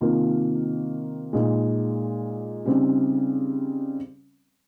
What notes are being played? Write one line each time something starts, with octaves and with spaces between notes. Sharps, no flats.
C3 D#3 A#3 F4
A#2 G#3 D#4
C#3 G3 C4 D#4